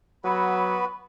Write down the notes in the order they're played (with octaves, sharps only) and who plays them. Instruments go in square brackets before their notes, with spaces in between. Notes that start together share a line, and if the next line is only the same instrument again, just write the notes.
[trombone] F#3 [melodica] B3 F#4 B4 [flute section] B5